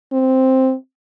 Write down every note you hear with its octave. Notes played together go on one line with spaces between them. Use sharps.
C4